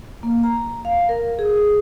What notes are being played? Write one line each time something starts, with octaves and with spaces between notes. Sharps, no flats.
A#3
A#5
F5
A#4
G#4